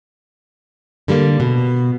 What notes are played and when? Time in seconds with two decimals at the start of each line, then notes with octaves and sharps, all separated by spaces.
1.08 D3 G3 A3 A#3
1.40 B2